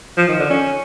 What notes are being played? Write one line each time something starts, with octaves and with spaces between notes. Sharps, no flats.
F3
D#3
D3
C#4